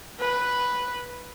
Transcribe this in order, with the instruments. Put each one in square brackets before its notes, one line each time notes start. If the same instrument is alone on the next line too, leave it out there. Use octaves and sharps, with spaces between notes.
[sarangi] B4